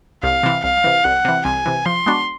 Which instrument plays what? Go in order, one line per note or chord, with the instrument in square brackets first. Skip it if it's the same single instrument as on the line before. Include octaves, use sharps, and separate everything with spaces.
[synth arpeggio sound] C2 [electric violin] F5
[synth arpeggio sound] C3 E3
[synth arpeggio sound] C2 [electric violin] F5
[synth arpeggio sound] C3 E3
[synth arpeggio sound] C2 [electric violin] F#5
[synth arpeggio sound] C3 E3
[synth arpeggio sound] C2 [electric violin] G#5
[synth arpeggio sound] C3 E3
[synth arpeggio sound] F3 [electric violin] C6
[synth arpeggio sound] G#3 B3 D4 F#4